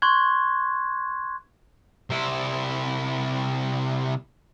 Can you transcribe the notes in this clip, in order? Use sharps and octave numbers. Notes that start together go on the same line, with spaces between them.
C6 C#6 F#6 G#6
C3 E4